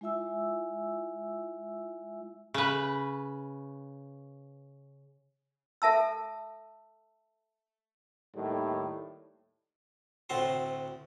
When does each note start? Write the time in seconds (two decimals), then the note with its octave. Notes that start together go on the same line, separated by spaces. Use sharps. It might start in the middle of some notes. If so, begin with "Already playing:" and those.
0.01 G#3 E4 F4 E5 G#5 E6
2.54 C#3 B4
5.82 A4 E5 A5 E6
8.35 D#2 A2 D#3 G3
10.29 D2 A2 C4 F#4 A5 C6